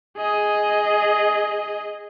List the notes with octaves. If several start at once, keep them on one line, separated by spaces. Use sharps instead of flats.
G#4 D#5